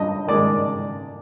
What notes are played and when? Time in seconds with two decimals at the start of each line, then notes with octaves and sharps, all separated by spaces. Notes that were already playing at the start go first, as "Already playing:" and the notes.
Already playing: G2 D#5
0.27 D#3 G#3 D5